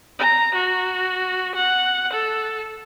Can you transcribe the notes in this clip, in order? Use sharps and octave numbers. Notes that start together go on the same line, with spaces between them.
A#5
F#4
F#5
A4